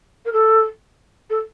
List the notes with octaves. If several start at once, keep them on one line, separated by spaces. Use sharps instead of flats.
A#4
A4
A4